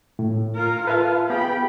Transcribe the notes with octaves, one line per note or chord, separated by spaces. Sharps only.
A2
F4 A#4
F4 A4 B4 E5 F5
B3 G4 G#4 G5 B5